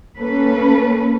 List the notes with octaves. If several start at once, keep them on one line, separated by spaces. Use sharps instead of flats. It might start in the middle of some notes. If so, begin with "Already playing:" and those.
A#3 C#4 A4 B4